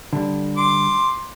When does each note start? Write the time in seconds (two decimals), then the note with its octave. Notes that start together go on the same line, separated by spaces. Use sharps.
0.13 D3 G3 D4
0.57 C6 D6